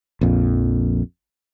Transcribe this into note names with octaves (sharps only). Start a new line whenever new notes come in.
A#1 F2